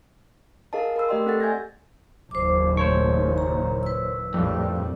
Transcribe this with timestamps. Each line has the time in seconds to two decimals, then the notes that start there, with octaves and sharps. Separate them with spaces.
0.73 G#4 A#4 D#5 F5 A5
0.96 A#4 B5 E6
1.09 A3 G4 D5 D#5 G5 C6
1.26 C4 A4 F#5 A6
1.40 E5 G#5 G6 G#6 A#6
2.31 F#1 D#2 A#2 C5 D6
2.77 A3 C5 C#5 C#6
3.38 A#5
3.83 B4 E6
4.34 A#1 F2 A2 G3